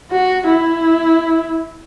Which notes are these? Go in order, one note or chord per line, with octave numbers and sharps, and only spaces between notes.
F#4
E4